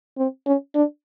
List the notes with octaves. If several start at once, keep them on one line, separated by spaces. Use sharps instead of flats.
C4
C#4
D4